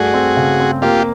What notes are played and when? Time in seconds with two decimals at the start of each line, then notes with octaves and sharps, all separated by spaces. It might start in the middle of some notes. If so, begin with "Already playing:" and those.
Already playing: G2 A3 F#4 G#4
0.14 C4
0.37 C#3
0.60 C4
0.82 A#3 F4 G4